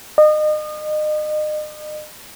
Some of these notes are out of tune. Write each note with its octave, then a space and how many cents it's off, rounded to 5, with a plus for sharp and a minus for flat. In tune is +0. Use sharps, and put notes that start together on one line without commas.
D#5 -35